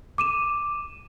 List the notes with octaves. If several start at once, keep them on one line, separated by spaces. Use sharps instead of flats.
D6 D#7 E7